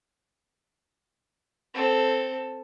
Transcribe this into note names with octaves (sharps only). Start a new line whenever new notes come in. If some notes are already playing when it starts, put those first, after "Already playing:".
C4 A4